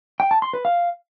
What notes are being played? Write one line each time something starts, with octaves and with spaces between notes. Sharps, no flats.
G5
A5
C6
B4
F5